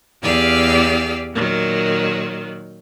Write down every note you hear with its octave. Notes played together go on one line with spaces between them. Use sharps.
E2 G4 G#4 D5 F5 E6
A#2 D#3 F#3